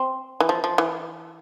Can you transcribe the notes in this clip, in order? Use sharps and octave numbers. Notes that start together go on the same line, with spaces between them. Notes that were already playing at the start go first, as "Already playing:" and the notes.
Already playing: C4
E3
F3
F3
E3